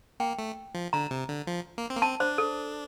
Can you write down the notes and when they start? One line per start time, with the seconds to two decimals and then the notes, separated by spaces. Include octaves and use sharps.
0.20 A#3 G5
0.39 A3
0.75 F3
0.93 D3 A#5
1.11 C3
1.29 D3
1.47 F3
1.78 A#3
1.90 C4
1.97 A#3
2.02 C4 A5
2.20 D4 C5
2.38 A4